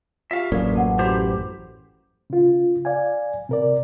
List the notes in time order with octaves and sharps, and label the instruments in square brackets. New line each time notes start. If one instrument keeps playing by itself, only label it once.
[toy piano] F4 G4 [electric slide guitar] E5 F5
[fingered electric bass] A1 F#2 [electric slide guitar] A#3 [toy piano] D5
[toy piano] F#5 A5
[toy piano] E4 F#4 C6 [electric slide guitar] G4 C5
[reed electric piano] C#3 F4
D5 F5 G#5
C3 A#4 D5